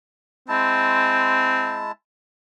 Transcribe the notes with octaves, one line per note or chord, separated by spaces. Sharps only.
G#3 C4 E4 A5